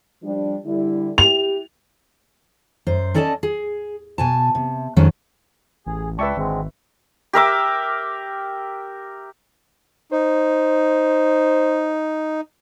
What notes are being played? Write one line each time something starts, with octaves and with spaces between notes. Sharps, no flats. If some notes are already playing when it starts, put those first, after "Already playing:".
F3 G3 D4
D3 G3 E4
E4 G4 F7
F#2 C5
C#4 A4 D5 D#5 G#5 A5
G#4
B2 G#5 A5
C3
F2 D#3 F3 F#3 G#3 C#4
A1 G#4
C#2 B4 D5 E5 G5 A5 C#6
G#1 D3 G#3 C4
G4 A#4 E5 D6
D#4 C5